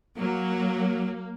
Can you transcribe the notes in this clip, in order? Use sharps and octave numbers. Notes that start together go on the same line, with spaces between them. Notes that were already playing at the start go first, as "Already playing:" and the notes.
F#3 A#3